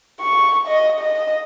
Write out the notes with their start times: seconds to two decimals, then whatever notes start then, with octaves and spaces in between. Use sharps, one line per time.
0.20 C#6
0.68 D#5
1.00 D#5